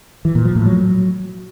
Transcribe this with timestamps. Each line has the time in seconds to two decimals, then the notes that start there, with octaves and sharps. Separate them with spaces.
0.25 E3
0.35 A#2
0.45 F3
0.56 A2
0.66 F#3